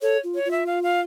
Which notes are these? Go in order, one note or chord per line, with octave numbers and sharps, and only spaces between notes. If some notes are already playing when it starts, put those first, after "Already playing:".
A4 C#5
F4
C#5
F4
E5
F5
F5